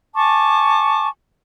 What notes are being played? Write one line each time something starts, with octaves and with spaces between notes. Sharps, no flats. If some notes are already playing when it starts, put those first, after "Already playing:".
G#5 A5 C#6 D6